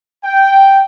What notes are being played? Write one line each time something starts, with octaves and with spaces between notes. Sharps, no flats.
G5